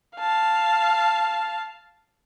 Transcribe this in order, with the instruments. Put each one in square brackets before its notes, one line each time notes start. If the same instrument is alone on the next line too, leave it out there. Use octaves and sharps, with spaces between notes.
[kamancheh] F5 A5